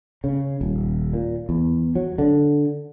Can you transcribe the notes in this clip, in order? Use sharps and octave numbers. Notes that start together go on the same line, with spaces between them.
C#3
D#1
A#2
E2
F#3
D3